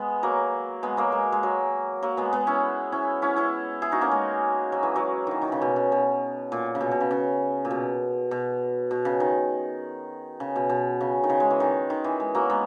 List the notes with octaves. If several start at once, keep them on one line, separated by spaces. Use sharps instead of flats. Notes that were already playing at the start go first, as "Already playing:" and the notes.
Already playing: G#3 B3
F#3 A#3
G#3 B3
F#3 A#3
G#3
G#3
F#3
F#3 A#3
G#3 B3
G#3 B3
C#4 E4
C#4 E4
C#4 E4
C#4 E4
E4 G#4
D#4 F#4
A#3 C#4
G#3
F#3
E3
F#3
D#3 E3
D#3
C#3
B2
C#3
B2
A#2
C#3
B2
B2
C#3
C#3
A#2
B2
B2
B2
C#3
D#3
C#3
B2
B2
C#3
D#3
C#3
G#3
E3
D#3
D#3
E3
G#3
F#3 A#3
G#3 B3